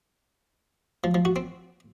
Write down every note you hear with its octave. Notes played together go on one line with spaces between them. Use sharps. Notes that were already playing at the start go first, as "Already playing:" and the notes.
F3
F3
F#4
C4